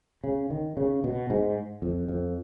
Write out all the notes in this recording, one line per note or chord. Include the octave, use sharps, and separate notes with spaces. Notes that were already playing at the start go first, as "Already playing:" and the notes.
C#3
D#3
C#3
B2
G#2
F2
F2